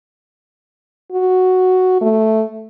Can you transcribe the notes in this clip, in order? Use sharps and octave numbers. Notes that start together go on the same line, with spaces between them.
F#4
A3